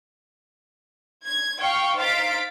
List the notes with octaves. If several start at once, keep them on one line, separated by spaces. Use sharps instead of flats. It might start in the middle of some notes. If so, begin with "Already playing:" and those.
G#6
F5 G5 C#6
D#4 C5 F5 A6 B6 D7